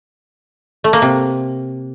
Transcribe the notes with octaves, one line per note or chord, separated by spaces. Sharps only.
A3
A#3
C3